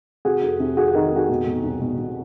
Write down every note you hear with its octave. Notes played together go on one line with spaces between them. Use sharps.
C3 F#4 G#4
F2
C3
F2 F#4 G#4
F#4
D#3
F2 F#4 G#4
B2
B2
C2
B2
B2